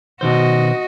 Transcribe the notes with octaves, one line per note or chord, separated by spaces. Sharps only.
B2 D#3 F#4 C5 D#5